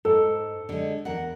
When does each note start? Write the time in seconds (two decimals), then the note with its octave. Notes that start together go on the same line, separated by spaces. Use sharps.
0.05 G#2 A4
0.69 D3 G#3
1.05 E2 A#4 F#5